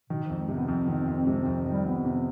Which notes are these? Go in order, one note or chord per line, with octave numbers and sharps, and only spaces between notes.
B2 D#3
F3
F2
G#3
C3
B3
F2 C4
D#3 B3
C4
F2
C4
C3 G#3
F2 C4
D#3
G3
F2 B3
C3